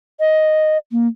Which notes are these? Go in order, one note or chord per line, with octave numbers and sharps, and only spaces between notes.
D#5
A#3